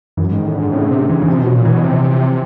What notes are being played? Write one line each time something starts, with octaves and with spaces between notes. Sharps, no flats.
F#2 E3
G#2 D#3
A2
D3
G#2
A2 C#3
C3
C3 E3
C#3 E3
C3 F3
B2 F#3
A#2
E3
B2
C3 F3